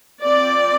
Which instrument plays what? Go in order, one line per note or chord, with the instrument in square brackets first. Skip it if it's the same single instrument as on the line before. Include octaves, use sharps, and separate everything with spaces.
[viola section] F3 C4 D5